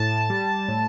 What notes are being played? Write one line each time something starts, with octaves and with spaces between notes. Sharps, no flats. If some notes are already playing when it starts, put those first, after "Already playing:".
Already playing: A2 A5
G3
A2